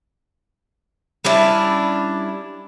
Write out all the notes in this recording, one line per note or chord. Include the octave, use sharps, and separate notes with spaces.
G3 C#4 D4 E4